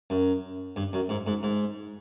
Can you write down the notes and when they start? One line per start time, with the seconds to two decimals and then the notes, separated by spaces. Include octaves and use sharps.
0.10 F#2
0.76 G2
0.93 F#2
1.09 G#2
1.27 G#2
1.43 G#2